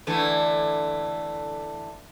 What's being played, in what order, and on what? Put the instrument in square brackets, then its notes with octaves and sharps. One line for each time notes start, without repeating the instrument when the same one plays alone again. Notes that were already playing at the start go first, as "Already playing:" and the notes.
[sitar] D3 E3 A3